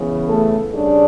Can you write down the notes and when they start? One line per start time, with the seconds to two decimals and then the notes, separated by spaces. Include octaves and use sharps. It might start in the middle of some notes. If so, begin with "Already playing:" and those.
Already playing: C#3 E3 B3
0.28 A3 A4
0.73 C#3 G3 D4